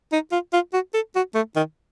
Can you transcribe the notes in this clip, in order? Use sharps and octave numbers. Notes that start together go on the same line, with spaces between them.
D#4
F4
F4
F#4
A4
F#4
A3
D#3